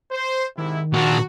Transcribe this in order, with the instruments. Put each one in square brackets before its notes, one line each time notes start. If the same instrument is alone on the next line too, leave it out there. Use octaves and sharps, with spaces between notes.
[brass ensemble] C5
[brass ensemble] G#2 C3 E4 [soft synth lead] D#3
[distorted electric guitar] A#2 D4 [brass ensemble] F#4